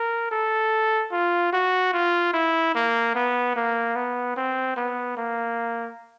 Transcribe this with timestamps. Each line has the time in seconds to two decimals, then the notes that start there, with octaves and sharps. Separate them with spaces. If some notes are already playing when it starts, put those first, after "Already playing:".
Already playing: A#4
0.31 A4
1.12 F4
1.53 F#4
1.94 F4
2.34 E4
2.75 A#3
3.15 B3
3.56 A#3
3.96 B3
4.36 C4
4.77 B3
5.17 A#3